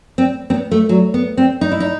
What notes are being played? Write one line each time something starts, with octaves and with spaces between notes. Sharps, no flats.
C4
C4
B3
A3
F#3
B3
C4
D#4
E4
D#4